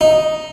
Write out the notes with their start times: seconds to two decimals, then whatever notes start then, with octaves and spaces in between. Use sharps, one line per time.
0.01 D#4